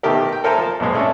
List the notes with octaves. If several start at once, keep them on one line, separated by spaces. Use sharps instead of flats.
B2 D#3 A3 G4 A#4
G5
A4 A#4 C5 E5 G#5 A#5
F3 A5
B1 F2 G#2 B2 G#3
A3 C#4 D4